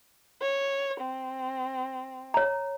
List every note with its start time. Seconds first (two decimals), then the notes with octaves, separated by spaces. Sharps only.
0.41 C#5
1.01 C4
2.34 C#5 A#5